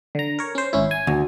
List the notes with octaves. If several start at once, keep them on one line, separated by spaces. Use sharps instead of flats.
D3 A#5
A#4 C#5
C#4 C5
G#1 C#4 E4
G#5
D2